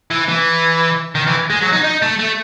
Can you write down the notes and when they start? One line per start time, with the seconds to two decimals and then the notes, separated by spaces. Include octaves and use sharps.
0.11 E3
0.28 E3
1.15 D#3
1.27 E3
1.50 G#3
1.62 F#3
1.73 D#4
1.84 D#4
2.02 A3
2.19 A3